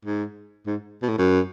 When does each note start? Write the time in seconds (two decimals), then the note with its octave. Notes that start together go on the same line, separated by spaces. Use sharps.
0.05 G#2
0.66 G#2
1.02 B2
1.09 A2
1.18 F#2